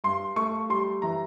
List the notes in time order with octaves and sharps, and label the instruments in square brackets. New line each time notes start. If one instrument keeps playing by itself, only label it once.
[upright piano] G2 C6
A3 C#6
G3 C6
E3 A#5